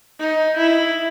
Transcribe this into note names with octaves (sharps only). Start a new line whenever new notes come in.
D#4
E4